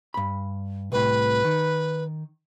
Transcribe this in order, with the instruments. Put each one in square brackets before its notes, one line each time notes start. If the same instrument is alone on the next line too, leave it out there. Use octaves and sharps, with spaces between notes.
[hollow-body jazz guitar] G2 B5
[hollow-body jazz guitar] C2 A2 [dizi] B4
[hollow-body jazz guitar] D#3